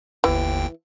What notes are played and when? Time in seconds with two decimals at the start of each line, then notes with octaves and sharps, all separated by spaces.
0.24 G1 D#2 E3 G5